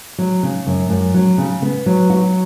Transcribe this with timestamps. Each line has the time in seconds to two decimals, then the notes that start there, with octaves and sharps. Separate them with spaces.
0.18 F#3
0.43 C#3
0.67 F#2
0.90 F#2
1.14 F#3
1.38 C#3
1.62 B3
1.86 F#3
2.10 F#4